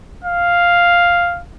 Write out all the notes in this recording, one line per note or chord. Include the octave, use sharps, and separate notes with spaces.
F5